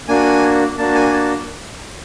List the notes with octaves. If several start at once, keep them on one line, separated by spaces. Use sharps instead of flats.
A#3 D4 F#4 G#5
A#3 D4 F#4 A5
G#5
A5